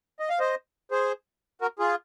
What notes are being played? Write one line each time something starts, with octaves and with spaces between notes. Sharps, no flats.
D#5
F5
C5 D#5
G#4 C5
F#4 A#4
F4 G#4